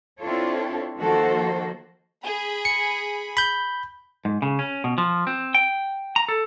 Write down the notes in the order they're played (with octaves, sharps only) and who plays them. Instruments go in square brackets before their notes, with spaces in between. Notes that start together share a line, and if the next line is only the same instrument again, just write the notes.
[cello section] C4 D4 E4 F4 A4 C#5
D#3 F3 A#3 F#4 A4 C5
[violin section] G#4 B5
[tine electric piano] C#7
B5 G6
[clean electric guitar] G#2
C#3
C#4
B2
F3
C4
G5
A#5
A4